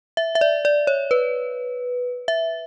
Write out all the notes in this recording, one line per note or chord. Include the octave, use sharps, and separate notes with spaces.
E5
E5
D5
D5
C#5
B4
E5